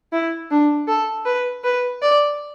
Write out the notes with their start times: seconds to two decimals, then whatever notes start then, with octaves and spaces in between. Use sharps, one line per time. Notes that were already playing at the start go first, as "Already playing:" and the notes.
0.12 E4
0.51 D4
0.88 A4
1.26 B4
1.64 B4
2.02 D5